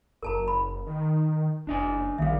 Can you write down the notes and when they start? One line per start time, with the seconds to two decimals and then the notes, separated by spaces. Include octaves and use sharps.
0.23 F#1 A#4 A5 A#5
0.48 B5
0.87 D#3
1.67 F#1 D4 D#5 G#5
2.18 A#1 D#3 G3 E5 F5